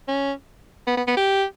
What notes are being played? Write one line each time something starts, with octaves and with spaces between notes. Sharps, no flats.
C#4
B3
B3
B3
G4